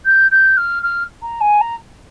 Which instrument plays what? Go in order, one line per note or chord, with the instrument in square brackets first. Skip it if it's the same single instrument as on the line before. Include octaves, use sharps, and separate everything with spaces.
[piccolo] G6
G6
F6
F6
A#5
G#5
A#5